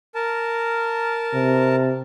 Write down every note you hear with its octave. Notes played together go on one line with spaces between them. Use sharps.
A#4 A5
C3